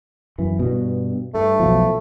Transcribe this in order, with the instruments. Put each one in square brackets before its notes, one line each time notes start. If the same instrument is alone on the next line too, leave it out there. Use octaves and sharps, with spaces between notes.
[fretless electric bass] F#2 E3
G2 B2
[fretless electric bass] G2 [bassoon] A3
[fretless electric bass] B1 B2 F3